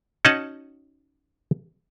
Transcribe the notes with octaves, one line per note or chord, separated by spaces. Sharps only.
C#4 D#4 F#4 D#5 F#5 A5